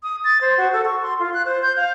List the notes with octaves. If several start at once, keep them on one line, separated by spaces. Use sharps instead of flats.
D#6
A6
C5
F#4
A4
C#6
C6
F4
F#6
C5
G6
F5